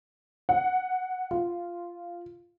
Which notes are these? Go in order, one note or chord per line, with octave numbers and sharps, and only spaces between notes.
F#5
F4